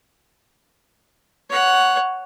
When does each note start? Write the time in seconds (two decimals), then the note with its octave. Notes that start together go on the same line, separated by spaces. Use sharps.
1.50 C#5 F#5